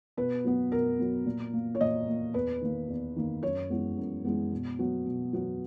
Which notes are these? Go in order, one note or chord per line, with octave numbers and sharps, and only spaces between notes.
B2 B4
F#3 B3
B2 A#4
F#3 B3
A#2
A#3
C#5
A#2 D#5
A#3
E2 B4
D#3 A#3
E2
D#3 A#3
F#2 C#5
E3 G#3 B3
F#2
E3 G#3 B3
B2
F#3 B3
B2
F#3 B3